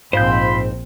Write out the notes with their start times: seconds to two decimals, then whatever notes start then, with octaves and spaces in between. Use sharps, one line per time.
0.13 A#1 G#2 C4 F4 C5 B5 C6 G6